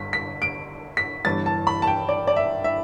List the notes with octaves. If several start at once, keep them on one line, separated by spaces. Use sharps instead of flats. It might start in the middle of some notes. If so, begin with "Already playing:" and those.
Already playing: G1 G2 D3 B6
B6
D7
B6
G1 G2 E3 A6
A5
B5
A5
G5
D5
D5
E5
E5